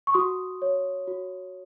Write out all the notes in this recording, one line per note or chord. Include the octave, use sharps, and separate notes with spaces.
C#6
F#4 C6 D#6
C#5
F#4